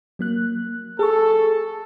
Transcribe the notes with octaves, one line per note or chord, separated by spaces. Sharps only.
F#3 A#3 F#6
G#4 A4 C#6